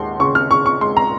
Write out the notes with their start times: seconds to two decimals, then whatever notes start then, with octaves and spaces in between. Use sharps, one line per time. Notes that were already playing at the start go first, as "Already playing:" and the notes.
Already playing: D#2 G#3 F#5 C6
0.20 C#3 C#6
0.35 F6
0.51 C#3 C#6
0.66 C#6
0.81 G#3 C6
0.97 A#5